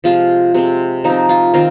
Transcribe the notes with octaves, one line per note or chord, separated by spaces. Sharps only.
C3 F3 G#3 F4
C3 G#3 C4
F3 C4 D#4
F4
D#3 C4 F4 A#4